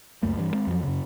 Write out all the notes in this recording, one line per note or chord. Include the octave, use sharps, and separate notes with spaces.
C#2 F#2 A3 A#3
G2 E3
G#3 C4
F2 F3 F#3
F#2 C#3